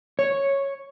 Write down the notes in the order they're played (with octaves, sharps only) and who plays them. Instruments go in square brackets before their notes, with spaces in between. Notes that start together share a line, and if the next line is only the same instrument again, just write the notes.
[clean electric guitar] C#5